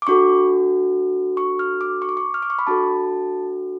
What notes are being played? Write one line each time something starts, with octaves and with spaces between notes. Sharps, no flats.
D6
D4 F#4 A4 C#6
C#6
F6
D6
C#6
D6
C#6
F6
D6
C#6
B5
D4 F#4 A4 A5